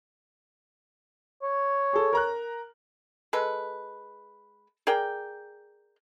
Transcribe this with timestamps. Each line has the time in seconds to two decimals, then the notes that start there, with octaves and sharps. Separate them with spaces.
1.42 C#5
1.93 G#4 A4
2.13 A#4 A#5 F#6
3.33 G#3 A4 B4
4.87 G#4 A#4 D5 G5